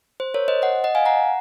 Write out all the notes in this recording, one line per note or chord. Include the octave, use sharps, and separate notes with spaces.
C5
A#4 C#5
C5 D#5
D#5 F#5
D#5 F#5
F5 G#5
F#5 A#5